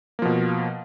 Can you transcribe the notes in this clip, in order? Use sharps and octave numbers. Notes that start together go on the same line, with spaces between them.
B2 F3 A#3